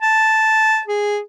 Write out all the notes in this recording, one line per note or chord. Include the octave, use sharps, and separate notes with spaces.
A5
G#4